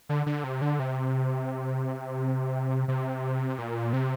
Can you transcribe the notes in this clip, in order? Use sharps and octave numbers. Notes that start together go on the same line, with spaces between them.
D3
D3
C3
D3
C3
C3
A#2
C3